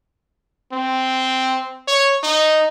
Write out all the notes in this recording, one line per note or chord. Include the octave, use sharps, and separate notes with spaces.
C4
C#5
D#4